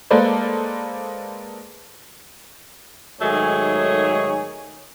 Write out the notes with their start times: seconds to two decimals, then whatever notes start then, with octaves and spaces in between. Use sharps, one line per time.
0.10 G#3 A#3 A4 B4 C5 D5
3.21 G#2 D#3 F#3 A3 G#4 C#5